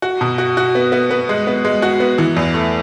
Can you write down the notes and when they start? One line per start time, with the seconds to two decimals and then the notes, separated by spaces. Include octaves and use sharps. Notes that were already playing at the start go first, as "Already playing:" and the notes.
0.02 F#4
0.21 B2
0.38 F#4
0.57 F#4
0.75 B3
0.92 B3
1.11 B3
1.29 G#3
1.47 B3
1.65 G#3
1.82 F#4
2.00 B3
2.18 E3
2.36 E2
2.54 A3